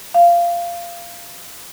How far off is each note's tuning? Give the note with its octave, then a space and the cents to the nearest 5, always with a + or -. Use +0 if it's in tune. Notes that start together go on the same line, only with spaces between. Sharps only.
F5 -15